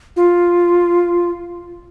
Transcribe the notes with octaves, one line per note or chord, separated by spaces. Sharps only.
F4